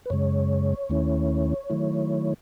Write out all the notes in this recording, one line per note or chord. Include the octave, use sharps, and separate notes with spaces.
B4
F#2 C#3 G#3 C#5
D#2 D#3 A3 C#4 E4
D#3 F#3 A3 E4